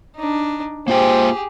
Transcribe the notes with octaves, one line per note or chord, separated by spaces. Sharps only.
D4 D#4
A#3 F4 G4 G#4 C5 G5